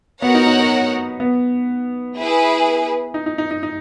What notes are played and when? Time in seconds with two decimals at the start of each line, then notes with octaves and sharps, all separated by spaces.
0.22 B3 F#4 A#4 C#5 F#5
0.35 D#4
0.46 D#4
0.59 D#4
1.20 B3
2.17 E4 G#4 B4
3.14 D#4
3.26 D#4
3.38 D#4
3.51 D#4
3.63 D#4